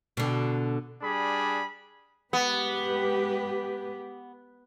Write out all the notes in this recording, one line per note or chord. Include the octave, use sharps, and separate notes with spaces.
B2 D3
G3 D4 G#4 B5
G#3 B3 G4 B4